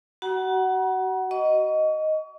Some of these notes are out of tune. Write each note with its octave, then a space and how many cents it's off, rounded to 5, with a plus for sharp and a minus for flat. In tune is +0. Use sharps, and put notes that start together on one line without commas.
F#4 +30 F#5 +15 A#5 +45
D#5 +0 C#6 +35